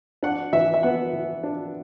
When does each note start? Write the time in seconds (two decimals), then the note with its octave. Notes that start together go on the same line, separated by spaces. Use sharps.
0.23 D4 F#5
0.53 E3 E5
0.74 E5
0.83 B3 F#5
1.13 E3
1.43 D4